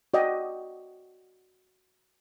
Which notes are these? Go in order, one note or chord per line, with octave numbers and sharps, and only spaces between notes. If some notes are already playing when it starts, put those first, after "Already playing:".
F#4 D5 D#5 G5 D6 D#6